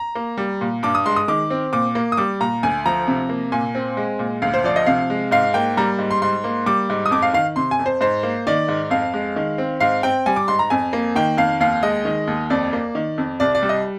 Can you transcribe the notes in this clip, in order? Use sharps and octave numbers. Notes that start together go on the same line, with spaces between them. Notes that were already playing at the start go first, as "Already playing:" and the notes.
Already playing: A#5
A#3
G3
A#2
G2 D6
D#6
G#3 C6
D#6
D#3 D6
C4
A#2 D6
A#3
D#6
G3 D6
A#2 A#5
D2 G#5
F3 A#5
C3
A#3
A#2 G#5
C4
G#3
A#2
D2 F5
C5
F3 D5
D#5
C3 F5
G#3
G#2 F5
A#3 G5
G3 A#5
G#2
C6
G#2 C6
A#3
G3 D6
G#2
D#6
F2 D6
F5
D#3 F5
C3 C6
G#5
F2
C5
G#2 C5
A#3
D#3 D5
G#2
F2 F5
G#3
D#3
C4
G#2 F5
C4 G5
G3 G#5
D6
G#2 C6
A#5
F2 G#5
A#3
D#3 G5
F2 F5
D#2 F5
G#3 D#5
D#3
D#2
F2 D5
A#3
D#3
F2
C2 D5
D5
G3
D#5